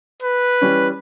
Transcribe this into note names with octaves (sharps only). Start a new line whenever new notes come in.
B4
E3 G3 C#4